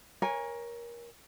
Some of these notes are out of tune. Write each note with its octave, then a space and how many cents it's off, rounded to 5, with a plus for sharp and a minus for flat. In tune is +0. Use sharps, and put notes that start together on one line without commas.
A#4 +20 C#5 +0 G#5 -15